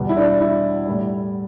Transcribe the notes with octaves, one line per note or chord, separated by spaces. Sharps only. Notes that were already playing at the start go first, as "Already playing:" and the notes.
Already playing: E2 B2 G3
E4
D4
E4
A2 G3